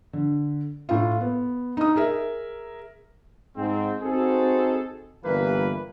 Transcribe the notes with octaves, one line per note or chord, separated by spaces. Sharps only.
D3
A2 F4
B3
D#4 D#6
G#4 A#4 E5
G#2 C4
C4 D#4 F#4 G#4 A4
G1 E3 G3 A#3 B4